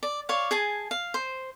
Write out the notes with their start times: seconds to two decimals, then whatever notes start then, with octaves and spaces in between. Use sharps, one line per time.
0.03 D5
0.29 C#5 D5 F5
0.51 G#4 G#5 A5
0.91 F5
1.14 C5